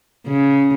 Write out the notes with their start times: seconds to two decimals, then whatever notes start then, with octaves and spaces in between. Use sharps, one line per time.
0.27 C#3